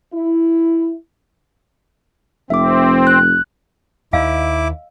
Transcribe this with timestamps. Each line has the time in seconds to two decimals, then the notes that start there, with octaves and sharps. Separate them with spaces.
0.13 E4
2.50 F1 C4 E5 D6
3.07 F#6
4.13 D#2 E4 D#5 F5 D6 E6